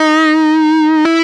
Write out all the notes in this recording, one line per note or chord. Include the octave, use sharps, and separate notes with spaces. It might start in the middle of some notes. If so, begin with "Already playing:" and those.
Already playing: D#4
E4